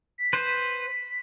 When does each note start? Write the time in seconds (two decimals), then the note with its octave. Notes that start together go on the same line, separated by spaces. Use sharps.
0.18 B6
0.33 B4 C5